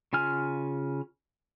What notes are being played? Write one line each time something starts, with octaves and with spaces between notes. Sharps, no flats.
C#3 F4 G#5 F6